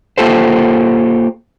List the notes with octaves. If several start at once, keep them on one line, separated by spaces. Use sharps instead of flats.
A#3 F4 G4 A4 C5